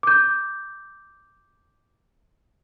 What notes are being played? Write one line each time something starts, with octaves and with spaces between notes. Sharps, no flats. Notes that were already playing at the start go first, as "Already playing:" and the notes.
D6 G6